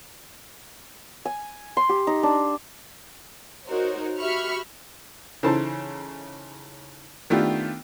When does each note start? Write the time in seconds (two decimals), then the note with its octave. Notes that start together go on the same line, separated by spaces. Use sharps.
1.25 G#5
1.77 C6
1.89 G4
2.07 D#4
2.23 D4
3.67 D#4 F#4 A#4 C5 C#5
4.19 F#4 G4 E5 B5 C#6 F6
5.43 C#3 E3 D#4 A4 C5 A5
7.30 D#3 A3 B3 D4 F4 G4